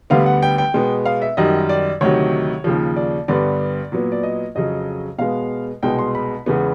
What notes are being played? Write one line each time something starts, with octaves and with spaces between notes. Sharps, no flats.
D2 D3 G3 B3 F5
F#5
G5
G5
B2 G#3 B3
F5
E5
F#2 D#3 G3 D#5
D5
D2 C3 D#3 F#3 C#5
D#2 C#3 F3
D5
G2 D3 G3 B3 D5
A#2 F#3 B3
D5
D#5
F2 C#3 F#3 D#5
B2 G#3 B3 F5
C2 B2 G#3 B3 G5
C6
B5
E2 C#3 E3 G#3 B3